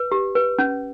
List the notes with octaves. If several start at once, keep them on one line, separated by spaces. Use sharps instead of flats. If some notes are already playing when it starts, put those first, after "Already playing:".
Already playing: B4
G4
B4
C#4